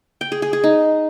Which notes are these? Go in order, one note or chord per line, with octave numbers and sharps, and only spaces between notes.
G5
G#4
G#4
G#4
D#4